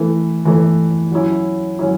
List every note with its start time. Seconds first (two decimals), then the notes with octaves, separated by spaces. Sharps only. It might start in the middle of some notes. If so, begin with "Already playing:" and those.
Already playing: E3 A3 E4 B4
0.45 E3 A3 E4 B4
1.11 F#3 C#4 E4
1.79 F#3 C#4 E4